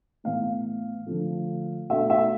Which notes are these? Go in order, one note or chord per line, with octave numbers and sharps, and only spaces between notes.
A2 E3 B3 F5
D3 F3 A3
B2 A3 D4 E5
E5